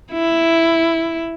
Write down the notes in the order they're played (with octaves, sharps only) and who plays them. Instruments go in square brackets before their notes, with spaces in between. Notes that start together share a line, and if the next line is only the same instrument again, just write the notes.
[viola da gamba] E4